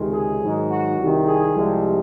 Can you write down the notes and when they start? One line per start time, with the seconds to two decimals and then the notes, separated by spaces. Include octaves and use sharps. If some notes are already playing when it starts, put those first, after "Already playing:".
Already playing: C#2 C3 D#3 G#3
0.11 G#4
0.39 G#2 D#3 F#3
0.69 F#4
0.97 C2 C3 D#3
1.26 G#4
1.54 C2 C3 F3 G#3